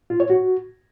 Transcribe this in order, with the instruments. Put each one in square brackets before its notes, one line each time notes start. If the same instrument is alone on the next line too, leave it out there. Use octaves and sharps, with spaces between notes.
[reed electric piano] F4
C#5
F#4